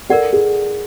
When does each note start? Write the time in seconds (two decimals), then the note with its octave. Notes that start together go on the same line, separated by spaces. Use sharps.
0.10 A4 A#4 D5 F#5
0.33 G#4